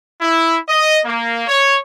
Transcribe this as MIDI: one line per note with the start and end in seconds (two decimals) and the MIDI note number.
0.21 0.58 64
0.68 1.00 75
1.04 1.45 58
1.48 1.78 73